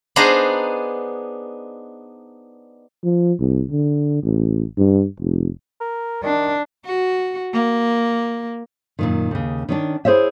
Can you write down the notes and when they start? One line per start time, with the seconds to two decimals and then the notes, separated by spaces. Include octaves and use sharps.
0.16 B3 D4 D#4 G#4 C5 A#5
3.04 F3
3.40 C2
3.71 D3
4.23 A1
4.78 G2
5.20 F1
5.81 A#4
6.23 D#3 D4
6.85 F#4
7.53 A#3
8.99 F#2 A#2 D#3
9.31 D#2 C#3
9.69 D#3 C#4 D4
10.05 E4 G#4 C5 C#5 E5